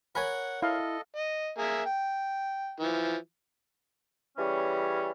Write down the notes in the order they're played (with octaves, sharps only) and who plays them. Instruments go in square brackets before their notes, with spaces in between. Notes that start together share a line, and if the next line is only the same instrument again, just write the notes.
[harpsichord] A#4 C#5 [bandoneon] F#5 [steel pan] G#5 B5
[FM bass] E4 [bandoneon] A4 D#5 [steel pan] F5
[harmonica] D#5
A#3 G#4 E5
G5
E3 F3
[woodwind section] C#3 E3 G3 C#4